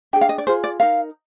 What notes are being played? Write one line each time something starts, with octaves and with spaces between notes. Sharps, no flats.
D4 G#4 G5
F5
D#5
D5
F4 G#4 C5
D5
D#4 A#4 F5